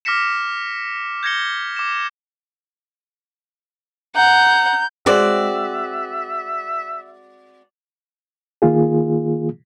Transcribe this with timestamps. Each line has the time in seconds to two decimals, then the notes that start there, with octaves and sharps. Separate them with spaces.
0.05 D6 F6 A#6 B6 C#7 E7
1.23 G6 G#6 A#6 C#7 G7
1.77 D6 E7
4.16 F#5 A#5 G6
5.06 G#3 C4 F#4 D5 E5
8.62 D#3 A#3 F4 G#4